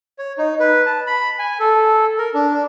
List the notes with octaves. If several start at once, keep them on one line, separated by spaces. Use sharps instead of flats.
C#5
D#4
B4
A5
B5
G#5
A4
A#4
D4